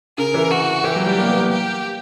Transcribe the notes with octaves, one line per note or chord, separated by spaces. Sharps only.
C#3 A#4
E3
F#4
E3 G4
F#3
G3
A#3
B3
A#3
G4